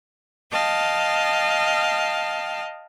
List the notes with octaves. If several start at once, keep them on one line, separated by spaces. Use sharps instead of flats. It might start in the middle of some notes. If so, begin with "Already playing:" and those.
D#5 F5 G5 A5